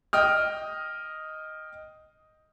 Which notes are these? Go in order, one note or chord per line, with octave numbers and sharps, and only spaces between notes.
D#5 G5 D#6 F6